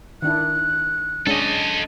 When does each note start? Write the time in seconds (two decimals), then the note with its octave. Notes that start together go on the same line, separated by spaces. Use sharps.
0.22 D#3 D4 E4 F#6
1.27 G#3 C#4 D4 A4 D#5